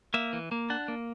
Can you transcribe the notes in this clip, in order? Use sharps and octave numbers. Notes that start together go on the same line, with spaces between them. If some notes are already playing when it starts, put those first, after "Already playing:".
A#3 E5
E3
A#3
D4 F#5
A#3